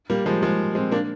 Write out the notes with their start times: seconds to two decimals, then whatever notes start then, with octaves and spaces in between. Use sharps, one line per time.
0.10 G3 A#3
0.26 F3 G#3
0.43 F3 G#3
0.75 G#3 C4
0.91 A#3 D4